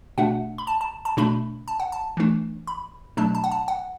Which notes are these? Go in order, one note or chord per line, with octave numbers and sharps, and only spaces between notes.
B2 A3 D4 F#5
B5
A5
A5
A5
B2 A3 D4 B5
A5
F#5
A5
E3 A3 D4
B5
B2 F#3 A3 D4 A5
A5
F#5
A5
F#5